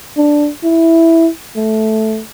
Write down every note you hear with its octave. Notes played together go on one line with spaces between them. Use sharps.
D4
E4
A3